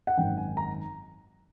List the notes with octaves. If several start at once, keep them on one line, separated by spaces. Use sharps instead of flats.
F#5
G#1 F#2 D#3 G5
G#5
A#5